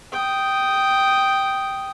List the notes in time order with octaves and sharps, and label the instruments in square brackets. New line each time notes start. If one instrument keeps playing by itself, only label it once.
[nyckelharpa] G5 D#6